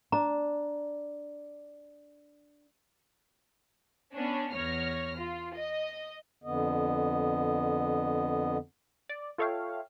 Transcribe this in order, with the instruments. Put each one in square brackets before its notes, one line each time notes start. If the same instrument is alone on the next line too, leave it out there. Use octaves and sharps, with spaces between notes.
[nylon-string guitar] D4 [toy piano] A#5
[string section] B3 C#4 D4
E2 C#5 F6 A#6
F4
D#5
[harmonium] F2 D3 B3 D#5
[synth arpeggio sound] D5
F4 A4 C#5 E5 F5 G5